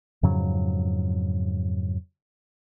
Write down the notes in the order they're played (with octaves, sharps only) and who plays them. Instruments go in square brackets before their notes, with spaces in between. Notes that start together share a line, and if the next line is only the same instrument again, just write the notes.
[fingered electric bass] F2 G#2 C#3 F#3